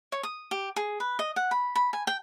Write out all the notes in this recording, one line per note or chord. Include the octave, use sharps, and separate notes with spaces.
C#5
D#6
G4
G#4
B4
D#5
F#5
B5
B5
G#5
G5